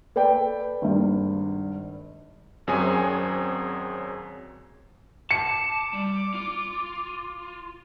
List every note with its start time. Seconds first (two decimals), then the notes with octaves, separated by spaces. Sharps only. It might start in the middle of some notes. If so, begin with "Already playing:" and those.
0.16 A4 B4 D5 G5
0.82 G#1 G2
2.67 G#1 F#2 F#3 C4 G#4 G#5
5.31 A5 D6 C#7
5.93 G3
6.34 F4